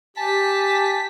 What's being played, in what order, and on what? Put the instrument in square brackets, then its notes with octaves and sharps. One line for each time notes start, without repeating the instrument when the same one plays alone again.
[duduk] G4 [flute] G#5 [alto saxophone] A5 [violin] B6